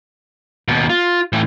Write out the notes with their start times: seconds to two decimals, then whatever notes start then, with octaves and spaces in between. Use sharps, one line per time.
0.68 D#2 B2
0.89 F4
1.33 A2 E3